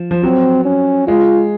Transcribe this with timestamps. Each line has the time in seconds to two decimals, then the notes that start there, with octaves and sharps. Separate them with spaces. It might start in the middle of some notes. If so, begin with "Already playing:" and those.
Already playing: F3
0.11 F3
0.23 F#3 C4
0.65 C#4
1.07 G#3 F4